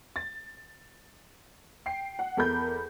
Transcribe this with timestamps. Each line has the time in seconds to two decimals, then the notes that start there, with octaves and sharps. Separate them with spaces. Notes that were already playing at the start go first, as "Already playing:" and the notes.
0.16 A6
1.86 G5 C7
2.19 F#5
2.37 E2 A4 A#4 B5 G6